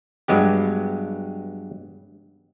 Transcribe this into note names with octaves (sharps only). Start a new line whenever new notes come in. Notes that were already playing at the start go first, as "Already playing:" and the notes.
G2 F#3 G#3 B3 G4